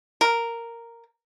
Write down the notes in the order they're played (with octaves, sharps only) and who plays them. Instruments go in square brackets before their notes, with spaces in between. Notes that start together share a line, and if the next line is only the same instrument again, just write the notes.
[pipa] A#4